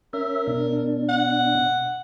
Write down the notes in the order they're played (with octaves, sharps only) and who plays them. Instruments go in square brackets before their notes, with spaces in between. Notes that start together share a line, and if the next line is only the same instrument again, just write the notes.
[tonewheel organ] C#4 E5 [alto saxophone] A#4
[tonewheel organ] B2 D4
[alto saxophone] F#5